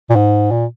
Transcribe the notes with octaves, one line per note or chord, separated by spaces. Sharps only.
A#2
G#2
A#2